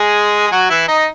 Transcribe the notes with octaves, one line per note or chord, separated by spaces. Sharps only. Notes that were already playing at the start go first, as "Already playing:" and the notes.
Already playing: G#3 G#4
G#4
F#3 F#4
E3 E4
D#4 D#5